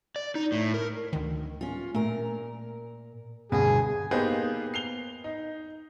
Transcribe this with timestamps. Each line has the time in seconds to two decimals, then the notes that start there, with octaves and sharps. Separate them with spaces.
0.16 D5
0.35 D#4
0.52 A2
0.74 A#4
1.13 D2 D#3
1.61 C#4 F4
1.95 A#2 A3 A#4
3.52 D2 G2 B2 G#4
4.11 A#3 B3 D#4 G4 G#4 C5
4.74 C7 F7 G7
5.24 D#4